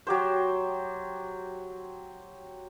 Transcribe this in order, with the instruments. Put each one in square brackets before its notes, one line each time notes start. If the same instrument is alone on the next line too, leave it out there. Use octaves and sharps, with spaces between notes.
[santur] F#3 G4 C5